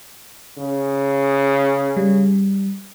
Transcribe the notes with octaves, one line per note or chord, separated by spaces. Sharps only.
C#3
G3